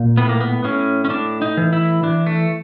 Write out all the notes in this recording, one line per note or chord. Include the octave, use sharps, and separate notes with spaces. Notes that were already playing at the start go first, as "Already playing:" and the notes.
Already playing: A#2
A2 B3
A#3
B3
A2 C#4
C#4
A2 D4
D#4
E3
E4
E3 D4
A3